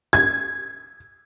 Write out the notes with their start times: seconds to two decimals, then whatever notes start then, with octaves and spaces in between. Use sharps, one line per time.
0.13 G#6